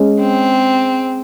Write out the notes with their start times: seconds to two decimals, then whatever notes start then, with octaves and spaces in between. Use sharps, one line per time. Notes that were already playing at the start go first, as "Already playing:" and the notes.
Already playing: G#3 C#4 G#4
0.20 C4